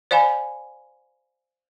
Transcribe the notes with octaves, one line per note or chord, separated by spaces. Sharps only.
C5 D5 F5 G#5 B5